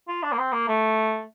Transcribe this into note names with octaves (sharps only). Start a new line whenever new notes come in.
F4
D4
A#3
C4
A#3
A3